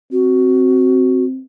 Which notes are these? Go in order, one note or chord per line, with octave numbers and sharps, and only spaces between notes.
C4 F#4